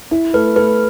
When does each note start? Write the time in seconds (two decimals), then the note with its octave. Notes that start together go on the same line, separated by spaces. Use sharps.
0.11 E4
0.34 A3 B4
0.56 A3 B4